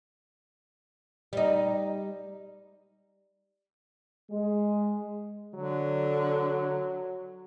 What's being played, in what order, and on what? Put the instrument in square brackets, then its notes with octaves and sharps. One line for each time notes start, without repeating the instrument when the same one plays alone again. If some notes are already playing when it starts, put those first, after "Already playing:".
[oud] G3 D#4
[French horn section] G#3
[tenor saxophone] D3 [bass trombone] F#3